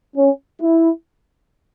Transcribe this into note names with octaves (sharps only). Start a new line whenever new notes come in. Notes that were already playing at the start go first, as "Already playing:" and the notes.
C#4
E4